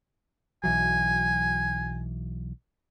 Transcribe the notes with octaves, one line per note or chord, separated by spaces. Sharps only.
B1 E3 F#3 G#5